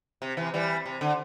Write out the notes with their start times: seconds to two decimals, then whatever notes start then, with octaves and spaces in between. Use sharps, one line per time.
0.22 C3
0.37 C3 E3
0.54 E3 G3
0.86 C3
1.01 D3